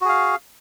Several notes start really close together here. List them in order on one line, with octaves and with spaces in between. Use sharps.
F#4 G#4 F5